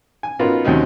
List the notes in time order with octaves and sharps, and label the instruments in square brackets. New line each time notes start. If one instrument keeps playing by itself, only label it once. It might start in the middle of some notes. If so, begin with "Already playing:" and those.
[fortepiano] G#5
B3 C#4 D#4 F4 F#4 A#4
D#2 C3 F#3 C#4 D#4